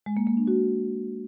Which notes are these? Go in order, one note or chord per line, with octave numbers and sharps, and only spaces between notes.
G#3
A#3
A#3
D4
F#4